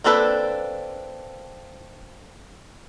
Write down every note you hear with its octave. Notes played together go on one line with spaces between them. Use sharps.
A#3 C4 D4 A4 B4